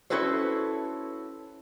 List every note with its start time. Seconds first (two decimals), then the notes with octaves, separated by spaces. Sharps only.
0.10 C#4 E4 F#4 A4 B4 C5